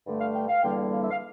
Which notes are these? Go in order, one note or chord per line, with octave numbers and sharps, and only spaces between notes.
G2 D3 A3
F5
G5
F5
E2 D3 G3 A#3 G5
F5
E5
F5